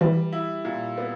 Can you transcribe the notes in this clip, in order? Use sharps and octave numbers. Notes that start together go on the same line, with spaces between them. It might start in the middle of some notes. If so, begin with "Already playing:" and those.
E3 G3
E4
A#2
B3